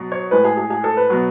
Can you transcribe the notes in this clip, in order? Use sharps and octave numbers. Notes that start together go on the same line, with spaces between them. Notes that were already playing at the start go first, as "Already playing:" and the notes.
Already playing: B2 F#3
C#5
A2 G#3 B4
G#4
G#4
G#4
A4
B4
B2 F#3